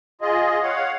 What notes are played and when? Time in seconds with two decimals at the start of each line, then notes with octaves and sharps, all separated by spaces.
0.21 F4 G#4 D#5
0.62 C#5 F5 F#5